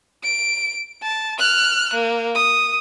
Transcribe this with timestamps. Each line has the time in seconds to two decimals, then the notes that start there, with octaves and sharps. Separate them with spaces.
0.24 D7
1.03 A5
1.39 F6 F#6
1.94 A#3
2.35 D#6